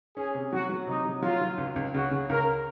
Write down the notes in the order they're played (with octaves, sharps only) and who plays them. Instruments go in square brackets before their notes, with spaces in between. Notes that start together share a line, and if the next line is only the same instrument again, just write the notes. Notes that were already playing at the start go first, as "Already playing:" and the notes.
[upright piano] C#4 [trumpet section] G#4
[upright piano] C3
[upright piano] F#3 [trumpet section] F#4
[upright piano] F#3
[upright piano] C3 [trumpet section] D#4
[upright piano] F#3
[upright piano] F#3 [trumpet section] F4
[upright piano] F#3
C#2
C#2
[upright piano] C#3 [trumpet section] F#4
[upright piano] C#3
[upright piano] C#2 [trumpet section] A#4